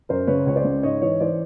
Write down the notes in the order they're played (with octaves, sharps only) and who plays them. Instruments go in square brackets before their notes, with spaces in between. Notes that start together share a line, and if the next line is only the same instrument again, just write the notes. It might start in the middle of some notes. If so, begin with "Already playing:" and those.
[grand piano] F#2 A#4 C5
C#3 B4 C#5
C#2 C#5
C5 D5
C#3
G#2 C#5 D#5
E3 C#5 D#5
E3 C5 D5